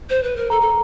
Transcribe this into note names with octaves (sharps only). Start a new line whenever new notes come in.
C5
B4
A#4
A4 A#5
A4